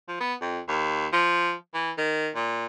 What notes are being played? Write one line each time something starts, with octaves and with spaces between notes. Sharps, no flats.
F3
B3
F2
D#2
F3
E3
D#3
A#2